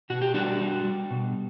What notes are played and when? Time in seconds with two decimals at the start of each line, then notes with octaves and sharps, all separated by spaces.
0.10 B2 F#4
0.22 G4
0.34 G3 D4 F#4
0.60 G3
0.85 G3
1.11 B2